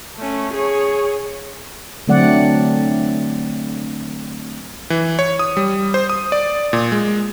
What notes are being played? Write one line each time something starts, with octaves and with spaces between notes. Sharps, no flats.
A3 C#4
G#4 C#5
D3 F#3 A3 C4 D5 F#5
E3
C#5
D#6
G3
C5
D#6
D5
A#2
G#3